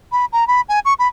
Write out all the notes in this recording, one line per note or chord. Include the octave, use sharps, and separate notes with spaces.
B5
A#5
B5
G#5
C#6
B5